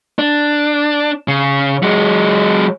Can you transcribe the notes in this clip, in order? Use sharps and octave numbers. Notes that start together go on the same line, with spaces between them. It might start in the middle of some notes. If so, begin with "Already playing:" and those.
D4
C#3
F#3 G#3